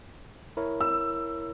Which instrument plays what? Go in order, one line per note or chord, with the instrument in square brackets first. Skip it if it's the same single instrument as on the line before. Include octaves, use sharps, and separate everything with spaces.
[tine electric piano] E4 A#4 C#5
[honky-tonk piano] E6